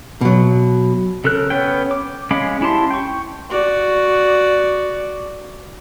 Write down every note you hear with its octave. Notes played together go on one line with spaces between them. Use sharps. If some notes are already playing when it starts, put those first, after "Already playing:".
B2 F#3
C#3 A4 A#4 F#6
B3 C#4 G5
D6
G#3 C#4 F5 B5 D6
C#4 E4 G4 A5 C6
G5 C#6
F#4 D5